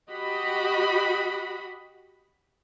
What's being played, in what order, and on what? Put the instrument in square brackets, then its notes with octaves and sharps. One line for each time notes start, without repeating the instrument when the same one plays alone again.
[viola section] F#4 G4 D#5 B5